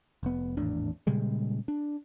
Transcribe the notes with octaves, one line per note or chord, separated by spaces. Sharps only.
F1 B3
G#1 E2 A2 D4
A#2 C#3 G3 G#3
D4